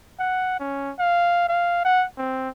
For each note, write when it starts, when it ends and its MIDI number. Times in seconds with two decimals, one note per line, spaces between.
0.19 0.57 78
0.60 0.92 61
0.99 1.44 77
1.48 1.83 77
1.85 2.06 78
2.18 2.49 60